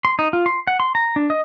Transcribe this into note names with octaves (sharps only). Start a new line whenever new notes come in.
C6
D#4
F4
C6
F#5
C6
A#5
D4
D#5